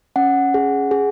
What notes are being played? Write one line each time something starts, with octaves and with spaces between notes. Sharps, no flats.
C#4 F#5
G#4
G#4